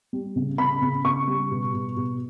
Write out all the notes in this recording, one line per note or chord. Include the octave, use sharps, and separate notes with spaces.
G3
C#3
C#3 B5
C#3
C#3 C#6
G3
B2
B2
B2